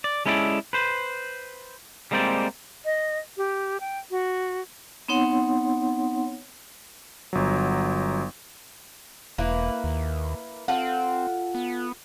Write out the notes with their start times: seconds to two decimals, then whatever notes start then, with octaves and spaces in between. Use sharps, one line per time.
0.04 D5
0.26 G#3 C#4 E4 A4 B4 D5
0.73 B4 C5
2.11 G3 G#3 A#3 C4 C5 D5
2.85 D#5
3.37 G4
3.80 G5
4.11 F#4
5.08 B3 C4 D#4 C#5 F#5 C6
7.33 G1 F#3
9.38 E1 A#3 E4 B4
9.84 D#2
10.68 C4 F4 A4 F#5
11.55 B3